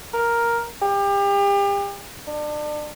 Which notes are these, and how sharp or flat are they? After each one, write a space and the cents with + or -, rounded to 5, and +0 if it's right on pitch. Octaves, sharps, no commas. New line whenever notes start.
A#4 +5
G4 +35
D4 +30